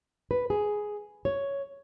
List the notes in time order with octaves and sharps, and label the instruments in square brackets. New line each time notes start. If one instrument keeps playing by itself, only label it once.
[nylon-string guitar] B4
G#4
C#5